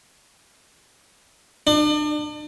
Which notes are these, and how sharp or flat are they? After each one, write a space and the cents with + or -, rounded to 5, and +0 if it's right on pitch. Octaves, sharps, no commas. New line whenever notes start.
D4 +40